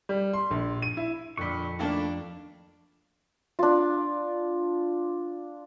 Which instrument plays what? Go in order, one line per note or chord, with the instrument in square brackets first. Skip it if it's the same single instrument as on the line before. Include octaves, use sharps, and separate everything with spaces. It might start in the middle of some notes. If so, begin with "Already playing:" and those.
[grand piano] G3
C6
A#1
D#7
E4
[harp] F2 [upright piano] A#2 D3 [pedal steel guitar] B5 C#6
[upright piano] D#3 A3 A#3 [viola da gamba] D4 [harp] F4
[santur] D4 F4